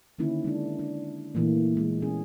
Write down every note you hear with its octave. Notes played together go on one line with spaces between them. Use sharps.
D3 D#3 A#3 C#4 E4
G#3 D4
D4
A#2 E3 A3 A#3
G#3
B3 C#4 G#4